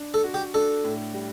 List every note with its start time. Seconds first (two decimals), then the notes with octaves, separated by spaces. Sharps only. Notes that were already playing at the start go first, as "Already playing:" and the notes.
Already playing: D4
0.14 A4
0.23 F#4
0.34 G4
0.54 D4 A4
0.84 A2
1.14 G3